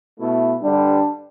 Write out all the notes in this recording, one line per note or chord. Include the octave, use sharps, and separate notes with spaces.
B2 A3 E4
G2 D3 G3 D4